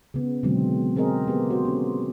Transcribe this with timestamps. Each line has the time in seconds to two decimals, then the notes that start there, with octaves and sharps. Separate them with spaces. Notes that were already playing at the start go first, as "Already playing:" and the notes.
0.14 C#3 B3
0.43 B2 D3 D#3 F#3 G#3 C4
0.96 C4 G#4 A#4 D#5
1.27 A#3 B3 G4 G#4
1.50 F#4 C5
1.65 C#4 G#4